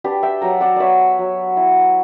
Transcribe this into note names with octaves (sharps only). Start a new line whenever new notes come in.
D4 G4 B4
E5 G5
F#3 F#5 A#5
D5 F#5
B3 C#5 D5 E5
F#3
E4